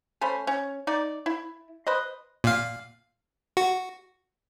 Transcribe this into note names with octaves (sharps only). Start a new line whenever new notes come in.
A3 C#4 C5 B5
C#4
D#4 D5
E4
B4 C5 D#5
A#2 F5
F#4